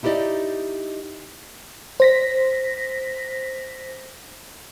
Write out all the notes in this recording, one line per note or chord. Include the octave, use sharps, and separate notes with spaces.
D#4 E4 G4 A#4 D5 D#5
C5 A#6 B6